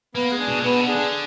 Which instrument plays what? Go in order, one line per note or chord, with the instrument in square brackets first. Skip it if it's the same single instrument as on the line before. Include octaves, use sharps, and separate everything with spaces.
[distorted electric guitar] A#3 [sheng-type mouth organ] B3
[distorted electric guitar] G#3
[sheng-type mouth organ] D4 G#4
[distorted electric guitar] B2
A#2
[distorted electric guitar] B2 [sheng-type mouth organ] B3
[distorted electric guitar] D3
[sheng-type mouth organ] D4 G#4
[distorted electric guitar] D3